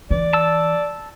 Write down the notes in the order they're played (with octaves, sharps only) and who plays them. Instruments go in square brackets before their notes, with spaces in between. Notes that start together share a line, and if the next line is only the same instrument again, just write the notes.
[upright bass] E3 [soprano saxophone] D5
[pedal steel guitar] A5 E6